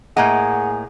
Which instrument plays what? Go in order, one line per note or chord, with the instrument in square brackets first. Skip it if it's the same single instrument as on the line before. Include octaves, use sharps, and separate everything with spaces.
[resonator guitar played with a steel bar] A2 A#3 D#5 [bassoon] G#4 [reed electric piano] F#5